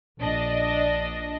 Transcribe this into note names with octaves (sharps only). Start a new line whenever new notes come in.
A#1 D4 D#5